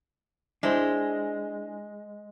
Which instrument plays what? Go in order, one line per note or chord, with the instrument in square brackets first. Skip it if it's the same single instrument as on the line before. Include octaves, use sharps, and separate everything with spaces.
[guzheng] G#3 [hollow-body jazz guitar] D4 E4 C5